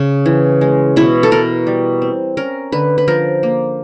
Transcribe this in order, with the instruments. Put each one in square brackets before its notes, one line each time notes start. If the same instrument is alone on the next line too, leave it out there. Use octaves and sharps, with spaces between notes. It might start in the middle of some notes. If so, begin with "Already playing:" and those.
Already playing: [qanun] C#3
E3
G#3
B2 E4
A4
B2 A#4
G3
C4
C#4 A#4
D3 B4
B4
F3 A#4
A#3